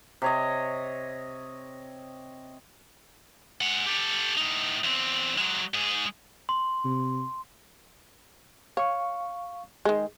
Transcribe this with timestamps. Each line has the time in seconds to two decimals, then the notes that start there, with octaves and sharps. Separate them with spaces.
0.22 C3 C#5 D#5
3.61 G#3 F#5
3.87 G4 A4
4.37 A2 D#4
4.84 E2 C4
5.38 F#3 G#3
5.74 G#2 G#4
6.49 C6
6.85 C3
8.77 C#5 F5 C#6
9.85 D#3 G#3 G#4